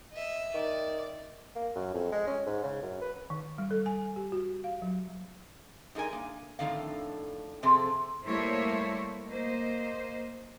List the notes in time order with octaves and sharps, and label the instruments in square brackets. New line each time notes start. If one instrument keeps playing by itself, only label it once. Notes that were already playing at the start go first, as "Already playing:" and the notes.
[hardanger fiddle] D#5 E5
[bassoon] D#3 [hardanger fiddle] D5
[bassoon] A#3
F#2
F2
G#3
C#4
G#2
C#3
F#2
B4
[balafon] D#3
G3
A4
G#5
G4
F#4
F5
F#3
[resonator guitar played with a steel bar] G2 D#4 G#4 A#4 G#5
A#3
F2 A2 D3 D#3 A#3 F5
C3 F3 C4 G#4 A4
[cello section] G3 A3 A#3 E4 C5 C#5
A#3 C5 D#5